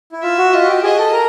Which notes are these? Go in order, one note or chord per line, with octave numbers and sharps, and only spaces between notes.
E4
F4 E5
F#4
F4 D#5
F#4
G4
G#4 D#5
A4
A#4